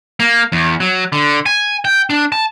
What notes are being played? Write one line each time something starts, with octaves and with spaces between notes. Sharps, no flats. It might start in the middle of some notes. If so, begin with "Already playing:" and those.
A#3
E2
F#3
D3
G#5
G5
D4
A5